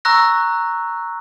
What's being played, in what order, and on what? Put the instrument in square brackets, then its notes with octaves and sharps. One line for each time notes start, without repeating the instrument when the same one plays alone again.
[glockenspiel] A#5 C#6 E6 F#6 A#6